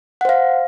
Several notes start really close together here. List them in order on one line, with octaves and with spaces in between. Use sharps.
F#5 C5 F5